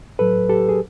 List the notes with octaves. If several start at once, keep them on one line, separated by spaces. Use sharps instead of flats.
A2 F#3 A4 B4
G4 A4
G#4